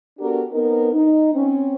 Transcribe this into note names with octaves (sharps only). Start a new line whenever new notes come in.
B3 D4 F#4 G4 A4 A#4
B3 C4 D#4 A#4
D#4
C4 C#4